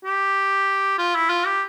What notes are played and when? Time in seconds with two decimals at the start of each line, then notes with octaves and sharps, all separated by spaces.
0.05 G4
0.98 F4
1.15 E4
1.30 F4
1.46 G4